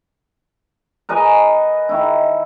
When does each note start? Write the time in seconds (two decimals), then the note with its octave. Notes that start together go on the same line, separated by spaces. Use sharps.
1.09 A#4 B4 D#5 G#5
1.89 D#3 E4